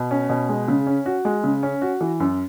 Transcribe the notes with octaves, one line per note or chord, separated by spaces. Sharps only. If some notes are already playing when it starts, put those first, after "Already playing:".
Already playing: B2
C#4
B2
G#3
C#3
C#4
F#4
G#3
C#3
C#4
F#4
E3
F#2